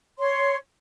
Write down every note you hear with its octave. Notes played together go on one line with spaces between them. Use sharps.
C#5 C6